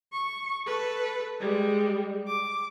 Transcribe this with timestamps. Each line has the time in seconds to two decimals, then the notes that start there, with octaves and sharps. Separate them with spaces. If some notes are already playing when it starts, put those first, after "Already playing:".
0.13 C#6
0.67 A4 B4
1.40 G3 G#3
2.28 D6